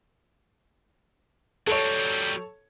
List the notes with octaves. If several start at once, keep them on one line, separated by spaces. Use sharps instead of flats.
F#3 G3 A4 C#5